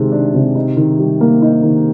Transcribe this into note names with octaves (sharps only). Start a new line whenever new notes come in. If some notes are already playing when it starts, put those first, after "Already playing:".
Already playing: C3 D#3 G#3
D4
C3
D#4
D#3
G3
A#3
D#4
D#3